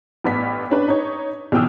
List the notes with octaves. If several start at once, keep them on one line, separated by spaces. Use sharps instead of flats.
A1 G2 B3 B6
C#4 D4 B4
D#4 C#5
B1 B2 E3 G5 D#6 E6